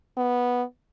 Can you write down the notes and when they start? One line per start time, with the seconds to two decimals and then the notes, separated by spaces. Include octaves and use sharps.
0.17 B3